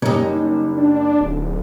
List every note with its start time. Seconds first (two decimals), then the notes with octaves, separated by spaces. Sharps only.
0.02 F#1 G3 C#4 D#4
0.77 D4
1.21 D1